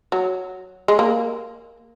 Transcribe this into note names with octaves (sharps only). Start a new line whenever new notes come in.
F#3
G#3
A#3